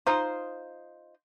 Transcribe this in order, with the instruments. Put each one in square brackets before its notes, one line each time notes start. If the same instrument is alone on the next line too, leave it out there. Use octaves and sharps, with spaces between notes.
[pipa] D#4 F4 C5